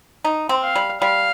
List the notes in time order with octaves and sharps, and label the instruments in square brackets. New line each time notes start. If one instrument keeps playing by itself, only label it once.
[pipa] D#4
C4
[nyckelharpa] F5
[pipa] G3
[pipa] G3 [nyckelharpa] F5